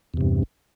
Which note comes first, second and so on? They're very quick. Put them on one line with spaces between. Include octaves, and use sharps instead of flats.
E2 C3 G2